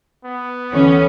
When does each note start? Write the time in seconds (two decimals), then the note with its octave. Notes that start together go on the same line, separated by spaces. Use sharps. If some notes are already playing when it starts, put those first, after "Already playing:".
0.25 B3
0.73 D2 E3 C#4 C#6